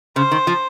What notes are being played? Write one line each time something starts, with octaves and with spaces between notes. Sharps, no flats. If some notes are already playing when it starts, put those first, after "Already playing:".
C#3 C5
D#3
F3